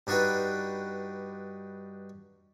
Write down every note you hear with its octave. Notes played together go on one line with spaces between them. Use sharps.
G2 D4 D#4 F#4 G4 B4